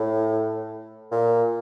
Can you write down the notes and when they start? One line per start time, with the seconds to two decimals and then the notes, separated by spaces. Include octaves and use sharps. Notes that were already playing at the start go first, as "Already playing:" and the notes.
Already playing: A2
1.12 A#2